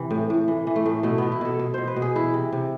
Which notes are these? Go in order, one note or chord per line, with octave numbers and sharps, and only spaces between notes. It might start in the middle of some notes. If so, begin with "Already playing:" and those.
Already playing: C3 E3
A2
A2
E3
E3
A3
A2
B2 A3
B2 B3
E4
B2 A4
B2
B2 C5
B4
B2
G#4
E3 E4
C3
C3